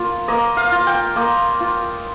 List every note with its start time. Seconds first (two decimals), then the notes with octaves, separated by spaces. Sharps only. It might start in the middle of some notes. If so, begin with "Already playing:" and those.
Already playing: A#3 F4
0.28 A#3 D#5
0.57 F5
0.72 F4
0.87 G5
1.16 A#3 D#5
1.60 F4